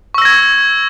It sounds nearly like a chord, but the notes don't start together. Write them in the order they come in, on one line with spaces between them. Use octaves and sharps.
C#6 E6 A#6 G#6